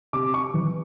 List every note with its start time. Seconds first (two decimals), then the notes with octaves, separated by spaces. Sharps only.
0.13 C3 D6
0.34 C#6
0.54 E3